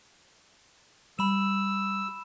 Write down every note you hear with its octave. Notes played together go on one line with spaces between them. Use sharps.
G3 B5 E6 E7